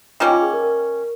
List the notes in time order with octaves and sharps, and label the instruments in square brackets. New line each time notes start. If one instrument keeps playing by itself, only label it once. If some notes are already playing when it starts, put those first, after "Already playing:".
[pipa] D#3 G3 A#3 C#4 [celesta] F4
[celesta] F4
G#4
A#4
A#4